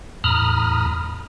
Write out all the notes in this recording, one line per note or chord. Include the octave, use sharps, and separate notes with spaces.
E2 A2 A#5 B5 D#6 F6